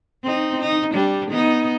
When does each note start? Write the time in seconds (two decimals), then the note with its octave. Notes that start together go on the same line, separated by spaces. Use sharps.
0.24 C4 D#4
0.61 D#4
0.93 G3 D4
1.30 B3 D#4